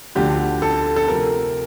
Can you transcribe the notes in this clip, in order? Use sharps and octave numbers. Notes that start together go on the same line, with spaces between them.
D2 D3 F3 G4
A4
A4
C3 F3 A#4